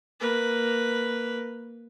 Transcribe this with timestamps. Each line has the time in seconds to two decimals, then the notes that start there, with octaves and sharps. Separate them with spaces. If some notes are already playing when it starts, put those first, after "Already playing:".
0.20 A#3 B4